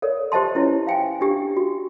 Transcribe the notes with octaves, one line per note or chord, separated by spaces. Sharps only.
A4 A#4 C#5 D5
G4 C5 D#5 A5 C6
C#4 E4 B4 C#5
F5 G5 G#5
D4 G4
F#4